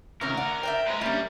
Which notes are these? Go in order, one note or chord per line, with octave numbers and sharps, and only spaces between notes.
C#2 C3 D#3 C#4 A#4
F#4 D5 F#5
C5 D5 E5 G5
G#3 A#4 B4
G3 A#3 C#4 A#4 E5